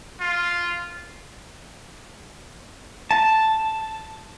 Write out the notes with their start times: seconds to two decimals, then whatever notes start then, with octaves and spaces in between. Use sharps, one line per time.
0.20 F4
3.11 A5